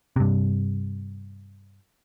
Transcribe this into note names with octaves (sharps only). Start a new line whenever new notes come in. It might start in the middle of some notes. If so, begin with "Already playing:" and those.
G2 C3